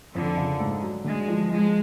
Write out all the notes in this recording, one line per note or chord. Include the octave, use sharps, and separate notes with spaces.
F2 D3
C#3
G#2
F#3
D3 G#3
F3
F3 G#3